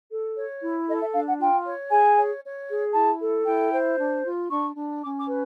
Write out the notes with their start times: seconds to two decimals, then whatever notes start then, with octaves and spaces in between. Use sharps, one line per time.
0.09 A4
0.36 C#5
0.62 E4
0.87 A4 D#5
1.01 E5
1.14 D4 F5
1.27 F#5
1.39 F4 G5
1.66 C#5
1.91 G#4 G#5
2.17 C#5
2.43 C#5
2.69 G#4
2.94 E4 A5
3.20 A4
3.46 E4 G5
3.72 C5
3.98 D4
4.24 F4
4.50 D4 C#6
4.75 D4
5.02 C#4 D6
5.20 D6
5.28 B4